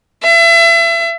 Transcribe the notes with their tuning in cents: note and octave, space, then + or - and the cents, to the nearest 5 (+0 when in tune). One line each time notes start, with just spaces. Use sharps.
E5 +35